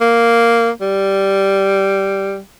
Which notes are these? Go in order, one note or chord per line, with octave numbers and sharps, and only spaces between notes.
A#3
G3